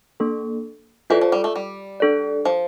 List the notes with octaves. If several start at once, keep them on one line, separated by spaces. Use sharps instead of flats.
A#3 D4 A4
E3 F4 A4 D5
F3
G3
A3
G3
D4 A4 D5
F3